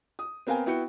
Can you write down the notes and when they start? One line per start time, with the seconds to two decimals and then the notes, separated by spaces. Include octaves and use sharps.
0.19 D#6
0.47 B3 C4 A#4 F5 G5 G#5
0.66 B3 E4 F#4 G5 C#7